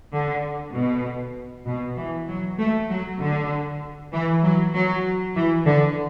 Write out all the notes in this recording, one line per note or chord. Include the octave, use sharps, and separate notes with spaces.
D3
B2
B2
E3
F#3
A3
F#3
D3
E3
F#3
F#3
E3
D3